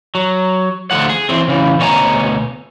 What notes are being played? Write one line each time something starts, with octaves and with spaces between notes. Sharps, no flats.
F#3
D2 D3 F3 F#5
G#4
E3 C4
C#3 E3
D2 B2 C#5 G5 G#5 A#5